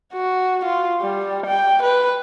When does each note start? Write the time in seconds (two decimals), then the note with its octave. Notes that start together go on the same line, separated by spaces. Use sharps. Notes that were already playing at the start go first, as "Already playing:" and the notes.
0.13 F#4
0.65 F4
1.01 G3
1.46 G5
1.83 B4